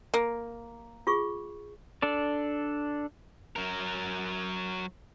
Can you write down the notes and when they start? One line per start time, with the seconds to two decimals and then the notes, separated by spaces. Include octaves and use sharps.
0.14 A#3
1.07 F4 G#4 C#6
2.02 D4 A4 D5
3.56 F#3 A#4